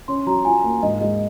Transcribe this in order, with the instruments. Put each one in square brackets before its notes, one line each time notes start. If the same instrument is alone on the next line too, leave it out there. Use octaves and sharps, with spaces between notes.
[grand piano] C#4 [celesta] C6
[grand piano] F#3 [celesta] A#5
[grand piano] F4 [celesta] G#5
[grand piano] A#3
[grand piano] G#2 [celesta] D#5
[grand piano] G#3 [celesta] D#5